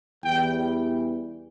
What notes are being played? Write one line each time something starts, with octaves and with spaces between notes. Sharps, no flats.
E2 E3 G3 G5